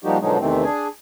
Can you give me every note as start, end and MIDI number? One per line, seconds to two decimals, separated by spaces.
0.04 0.17 53
0.04 0.17 55
0.04 0.17 58
0.04 0.17 63
0.04 0.17 66
0.04 0.17 67
0.21 0.38 47
0.21 0.38 50
0.21 0.38 53
0.21 0.38 54
0.21 0.38 56
0.21 0.38 63
0.39 0.64 40
0.39 0.64 48
0.39 0.64 51
0.39 0.64 52
0.39 0.64 57
0.39 0.64 60
0.64 0.88 62
0.64 0.88 68
0.64 0.88 80